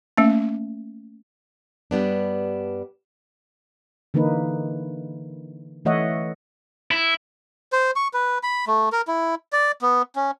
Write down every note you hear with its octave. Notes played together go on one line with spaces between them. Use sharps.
A3 A#3 C#4
G2 G3 B3 D4
D3 E3 A#3 D#4 B4
E3 A3 C#5 D#5 E5 F#5
E4
C5
C#6
B4
B5
A3
A#4
E4
D5
B3
C#4